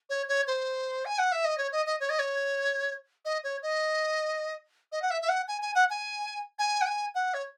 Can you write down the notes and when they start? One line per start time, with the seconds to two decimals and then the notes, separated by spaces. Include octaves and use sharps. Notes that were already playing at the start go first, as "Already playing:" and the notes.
0.10 C#5
0.29 C#5
0.47 C5
1.05 G#5
1.19 F#5
1.32 E5
1.45 D#5
1.58 C#5
1.72 D#5
1.86 D#5
2.00 C#5
2.10 D#5
2.19 C#5
3.25 D#5
3.44 C#5
3.63 D#5
4.92 D#5
5.02 F#5
5.11 E5
5.22 E5
5.29 F#5
5.48 G#5
5.62 G#5
5.75 F#5
5.90 G#5
6.59 G#5
6.81 F#5
6.86 G#5
7.15 F#5
7.34 C#5